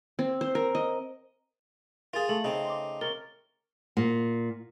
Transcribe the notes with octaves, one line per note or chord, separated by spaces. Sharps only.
C4
C5
A#4
D#5
F4 G#4 A#4 F5 A6
A3 F#7
C#3 C4 D#4
C6 D6
A#4 C#5 A6 G7
A#2